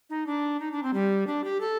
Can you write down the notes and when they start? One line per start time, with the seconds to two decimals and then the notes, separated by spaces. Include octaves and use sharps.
0.10 D#4
0.27 D4
0.60 D#4
0.72 D4
0.83 C4
0.94 G3
1.27 D4
1.44 G4
1.61 A4